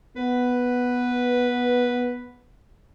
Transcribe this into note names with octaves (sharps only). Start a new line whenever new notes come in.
B3 B4